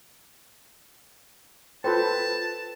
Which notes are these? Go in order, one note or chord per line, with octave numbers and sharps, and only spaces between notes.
F4 A4 B4 C5 G5 A5